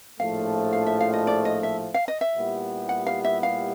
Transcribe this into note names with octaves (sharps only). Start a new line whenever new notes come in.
A#1 A2 F3 A3 F5
F5
E5
F5
D#5
D5
D#5
E5
F5
D#5
E5
A#2 G3 B3 E4 G4
F#5
F5
E5
F5